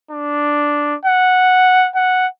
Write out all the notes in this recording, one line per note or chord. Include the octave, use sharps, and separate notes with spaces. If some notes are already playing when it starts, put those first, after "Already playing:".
D4
F#5
F#5